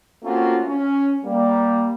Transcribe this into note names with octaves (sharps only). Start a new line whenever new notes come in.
A3 A#3 C4 C#4 F4 F#4
C#4
G3 A#3